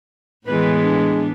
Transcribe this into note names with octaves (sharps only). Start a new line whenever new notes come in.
A2 E3 G#3 B3 B4
D4